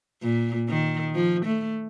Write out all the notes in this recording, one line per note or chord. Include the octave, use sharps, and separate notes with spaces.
A#2
D#3
F3
A3